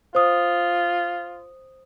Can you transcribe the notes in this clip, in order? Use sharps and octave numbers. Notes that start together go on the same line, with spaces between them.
F4 C5 D#6